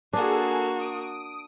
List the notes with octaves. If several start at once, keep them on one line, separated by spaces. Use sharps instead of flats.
A#3 D4 F#4 G#4 A4
D#6 D7